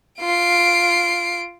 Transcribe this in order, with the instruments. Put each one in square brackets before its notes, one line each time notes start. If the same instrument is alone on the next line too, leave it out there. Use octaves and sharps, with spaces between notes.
[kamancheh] F4 [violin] C7 D7